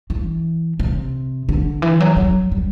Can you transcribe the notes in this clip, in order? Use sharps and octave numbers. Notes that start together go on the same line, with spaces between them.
E3
C3
D3
E3
F#3
F#3
G3